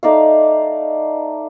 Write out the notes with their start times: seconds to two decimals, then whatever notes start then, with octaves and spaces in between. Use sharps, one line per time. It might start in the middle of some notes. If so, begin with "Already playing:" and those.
0.03 A3 D#4 D5 F5